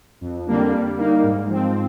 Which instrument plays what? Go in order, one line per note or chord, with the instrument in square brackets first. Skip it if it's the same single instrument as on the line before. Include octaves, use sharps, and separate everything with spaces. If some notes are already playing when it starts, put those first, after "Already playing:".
[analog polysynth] F2
D3 G3 A#3 D4
G3
A#3 D#4
G#2
F3 C4